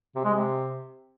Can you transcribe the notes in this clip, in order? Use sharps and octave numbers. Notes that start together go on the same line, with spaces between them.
C3
G#3
C3